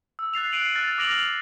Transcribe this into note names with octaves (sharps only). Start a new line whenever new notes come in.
E6
F#6 A6 C7 F7
F#6 C7 D7 D#7 F#7
F6 F#6 A6
D6 F6 A#6 D7 F7 F#7